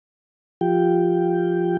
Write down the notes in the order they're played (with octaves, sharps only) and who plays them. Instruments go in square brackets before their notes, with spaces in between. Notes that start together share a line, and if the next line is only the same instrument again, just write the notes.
[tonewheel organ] F3 F4 G4 G5